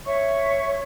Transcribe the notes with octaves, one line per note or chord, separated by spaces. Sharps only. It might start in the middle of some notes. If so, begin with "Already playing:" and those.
C#5 E5 C#6